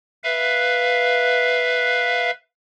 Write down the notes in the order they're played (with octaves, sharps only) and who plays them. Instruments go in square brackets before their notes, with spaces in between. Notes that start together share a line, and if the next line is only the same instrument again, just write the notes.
[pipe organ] B4 E5 F5